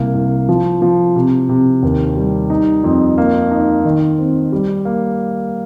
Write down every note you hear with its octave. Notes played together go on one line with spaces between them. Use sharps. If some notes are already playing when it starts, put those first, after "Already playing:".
Already playing: C2 A#3
C2
F3
F3
C3
C3
D#2
G3
D#4
F2
A#3
D#4
D#3
C4
G3
A#3